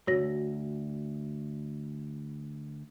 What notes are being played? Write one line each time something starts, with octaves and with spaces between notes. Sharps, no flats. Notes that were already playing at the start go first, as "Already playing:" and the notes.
D2 G#2 F#4 C#5 A#6